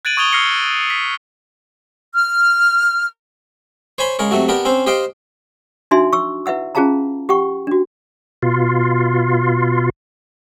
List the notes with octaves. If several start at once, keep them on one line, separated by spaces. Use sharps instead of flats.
F#6 G#6 A6 D7 D#7 F#7
C#6 D#6 G#6 F7 G7
E6 F6 A#6 C7 C#7 G7
B6
F6
C5 C#5 G#5 B5 C6
C#3 G#3 A#4 C#5
C3 F#3 A3 F#4
B3 D4 G4 A#4
C4 C#4 C5
G4 C5 D#5 F5 G5
D4 D#4 F#4 E5 G#5 C6
C#6 E6
E4 B4 E5 F#5 E6
C#4 F4 G#4 F5 A5 A#5
G4 F#5 G5 C#6
D4 F#4
B2 F4